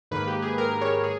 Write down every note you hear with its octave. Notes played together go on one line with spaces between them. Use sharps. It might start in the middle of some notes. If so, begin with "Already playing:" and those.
G#2 D#3 A#3 B4
G4
G#4
A#4
C#5
G#4